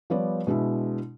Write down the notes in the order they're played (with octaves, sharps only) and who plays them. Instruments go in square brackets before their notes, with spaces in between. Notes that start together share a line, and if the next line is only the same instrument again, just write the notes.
[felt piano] F3 G3 B3 C#5 D5
B2 G#3 D4 E4